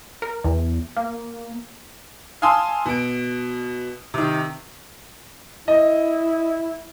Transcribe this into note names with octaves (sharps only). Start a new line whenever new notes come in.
A#4
E2
A#3
F5 G#5 A5 C6 D#6 E6
B2 D7
C3 D#3
E4 D#5